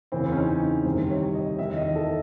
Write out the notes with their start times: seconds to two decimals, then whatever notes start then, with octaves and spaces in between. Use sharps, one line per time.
0.12 E2 C#3 E3 C4
0.32 C#4
0.36 D#4
0.85 C2 C3 D#3 C5
1.10 C#5
1.34 D#5
1.59 E2 D#3 E5
1.77 D#5
1.96 A4